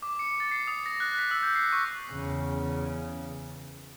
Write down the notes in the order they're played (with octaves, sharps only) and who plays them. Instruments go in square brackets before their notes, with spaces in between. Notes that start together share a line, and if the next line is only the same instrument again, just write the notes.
[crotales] D6
C#7
A6
C7
D#6
A#6
F#6
B6
E6
G6
C7
C#6
[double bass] E2 C#3